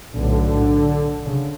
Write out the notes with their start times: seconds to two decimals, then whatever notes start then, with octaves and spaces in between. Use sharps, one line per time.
0.14 B1 A2 D3
1.27 C#3